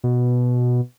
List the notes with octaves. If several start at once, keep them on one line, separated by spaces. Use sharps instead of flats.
B2